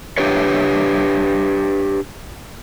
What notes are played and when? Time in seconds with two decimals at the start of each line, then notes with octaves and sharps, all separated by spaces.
0.18 D4 G4 B4 C#5